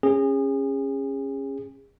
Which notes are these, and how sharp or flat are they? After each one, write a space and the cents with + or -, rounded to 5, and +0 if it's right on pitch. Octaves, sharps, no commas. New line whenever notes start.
C#4 -20 G#4 -30